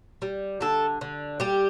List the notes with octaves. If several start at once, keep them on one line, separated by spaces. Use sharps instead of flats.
G3
D3 A4
D3
G3 G4